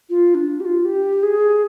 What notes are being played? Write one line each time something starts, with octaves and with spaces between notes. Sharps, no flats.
F4
D4
G4
F4
G4
G#4